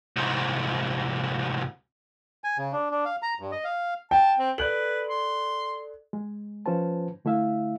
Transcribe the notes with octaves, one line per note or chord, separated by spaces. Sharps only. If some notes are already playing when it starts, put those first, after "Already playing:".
C2 G#2
G#5
C#3
D4
D4
F5
A#5
G2
D#5
F5
G5 A5
C4
A4 B4 D5 F#6 F#7
C6
G#3
F3 C#4 F4 B4 C5 A5
D3 A3 E4 E5 F5